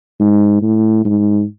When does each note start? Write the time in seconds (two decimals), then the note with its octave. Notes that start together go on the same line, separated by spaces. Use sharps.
0.20 G#2
0.62 A2
1.05 G#2